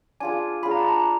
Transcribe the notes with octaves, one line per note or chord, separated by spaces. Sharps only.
D4 F4 G#4 G#5
D4 F4 G#4 B5
A#5
A5
A#5